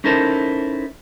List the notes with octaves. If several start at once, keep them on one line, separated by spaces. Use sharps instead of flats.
C#4 D#4 E4 A4 A#4 C5